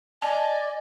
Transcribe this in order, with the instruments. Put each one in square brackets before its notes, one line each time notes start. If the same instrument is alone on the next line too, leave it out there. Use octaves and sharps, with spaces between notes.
[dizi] D5 [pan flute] D#5 [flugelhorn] G#5 [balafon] A5